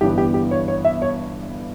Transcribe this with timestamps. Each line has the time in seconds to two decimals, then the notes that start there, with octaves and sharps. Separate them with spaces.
0.01 G1 G2 E3 B3 D4 G4
0.18 G4
0.34 G4
0.51 C#5
0.68 C#5
0.85 E5
1.02 C#5